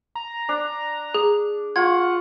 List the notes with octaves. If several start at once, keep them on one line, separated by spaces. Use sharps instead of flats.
A#5
D4
G#4
F4 F#5 C#6 G#6